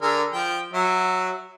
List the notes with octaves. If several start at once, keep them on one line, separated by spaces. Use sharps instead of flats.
D3 G#4 A#4
F3 G5
F#3 E5